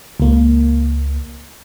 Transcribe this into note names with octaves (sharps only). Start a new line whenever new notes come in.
C#2 A#3